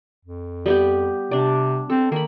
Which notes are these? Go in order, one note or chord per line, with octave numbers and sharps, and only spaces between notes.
F2
G3 B3 G4
C3 D4 D5
C4 A4
D#3 A#3 B5